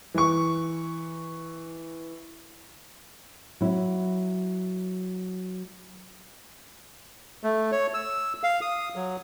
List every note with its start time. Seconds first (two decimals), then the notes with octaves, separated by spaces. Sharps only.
0.14 E3 C#6
3.61 F#3 E4
7.44 A3
7.72 C#5
7.94 E6
8.43 F5
8.62 D#6
8.96 F#3